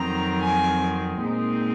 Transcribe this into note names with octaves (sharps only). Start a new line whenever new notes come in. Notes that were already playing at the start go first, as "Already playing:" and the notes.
Already playing: F2 D#3 F#3 C4 A#5
G#5
A#2 G#3 C4 D#4